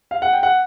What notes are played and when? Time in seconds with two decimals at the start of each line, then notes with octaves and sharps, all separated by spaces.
0.11 F5
0.22 F#5
0.33 G5
0.43 F#5